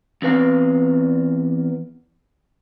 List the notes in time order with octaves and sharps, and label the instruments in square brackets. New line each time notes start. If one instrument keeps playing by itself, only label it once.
[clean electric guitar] E2 C4 B4 F5